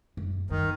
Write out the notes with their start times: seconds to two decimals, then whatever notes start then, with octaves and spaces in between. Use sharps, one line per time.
0.17 F#2
0.50 F#2 D#3